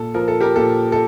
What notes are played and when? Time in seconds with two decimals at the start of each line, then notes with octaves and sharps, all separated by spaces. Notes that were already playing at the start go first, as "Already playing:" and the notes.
Already playing: A#2 A4
0.14 F3 A#4
0.28 A4
0.41 G4 A#4
0.56 A#2 A4
0.92 A4